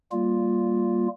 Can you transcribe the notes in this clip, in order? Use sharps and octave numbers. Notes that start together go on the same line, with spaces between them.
G3 A#3 F4